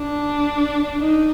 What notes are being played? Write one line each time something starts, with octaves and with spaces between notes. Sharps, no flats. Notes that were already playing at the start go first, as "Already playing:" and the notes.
Already playing: D4
D#4